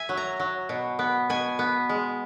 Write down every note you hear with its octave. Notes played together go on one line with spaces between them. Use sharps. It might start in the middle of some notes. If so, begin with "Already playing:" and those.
Already playing: E5 G#5
F#3
A#5
F#3
B2
B3
B2 G#5
B3
G#3